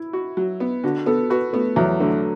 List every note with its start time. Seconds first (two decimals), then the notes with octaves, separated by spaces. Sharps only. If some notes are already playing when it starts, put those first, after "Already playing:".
Already playing: E4
0.13 F#4
0.37 F#3
0.60 B3
0.83 D3 F#4
1.06 B3 A4
1.30 F#4 B4
1.53 A3 B3
1.76 E2 F#3
2.00 D3 A3